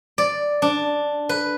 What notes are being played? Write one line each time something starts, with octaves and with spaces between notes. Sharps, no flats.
D5
D4
B4